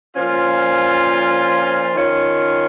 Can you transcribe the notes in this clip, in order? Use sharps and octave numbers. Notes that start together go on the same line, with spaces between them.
A#2 F3 C#4 F4
D#3 C#4 F4